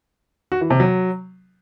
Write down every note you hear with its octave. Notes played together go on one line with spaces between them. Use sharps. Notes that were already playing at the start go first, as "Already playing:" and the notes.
F#4
E3
C3
F#3